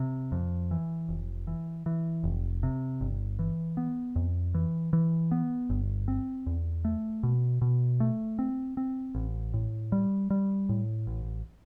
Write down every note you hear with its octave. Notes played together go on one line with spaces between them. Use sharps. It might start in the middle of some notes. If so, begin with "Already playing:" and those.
Already playing: C3
F2
E3
F1
E3
E3
F1
C3
G1
E3
B3
F2
E3
E3
B3
G1
C4
E2
A3
B2
B2
A3
C4
C4
A1
A2
G3
G3
A2
A1